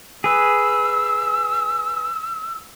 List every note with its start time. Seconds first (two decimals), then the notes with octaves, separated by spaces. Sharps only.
0.24 G#4 B4 E6